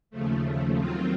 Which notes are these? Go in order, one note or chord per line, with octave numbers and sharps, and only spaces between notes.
D#2 C#3 F3 A3
D#2 D#3 F#3 C4 F4